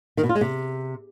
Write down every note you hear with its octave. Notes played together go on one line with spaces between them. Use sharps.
D#3
B2
F4
G#3
C3